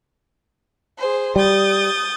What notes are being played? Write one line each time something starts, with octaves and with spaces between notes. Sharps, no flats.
G#4 C5
G3 D#6 G6 A6